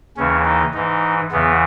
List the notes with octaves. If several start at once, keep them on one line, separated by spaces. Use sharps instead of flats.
D#2 C#3 E3 C#4
D#4
G#2 E3 D#4
E2 C#3 E3 B3